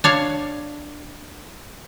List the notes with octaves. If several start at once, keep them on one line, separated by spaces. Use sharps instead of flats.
D4 C#5 F5